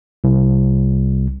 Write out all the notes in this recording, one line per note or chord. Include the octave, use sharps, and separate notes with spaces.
C2